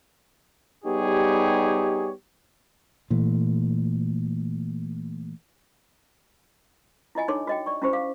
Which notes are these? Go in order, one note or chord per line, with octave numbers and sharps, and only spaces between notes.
G3 B3 D#4 G4 G#4 C#5
A#2 E3 A3
E4 F4 D#5 G#5
D4 D#4 A4 C#5 C6 D6
F#4 D#5 G5
D5 C#6
C#4 E4 F#4 G4 C5
F5 D6